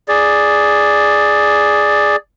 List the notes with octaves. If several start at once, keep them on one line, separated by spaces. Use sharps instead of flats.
G#4 D5